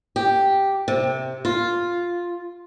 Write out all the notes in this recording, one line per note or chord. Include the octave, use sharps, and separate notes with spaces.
G4
C3
F4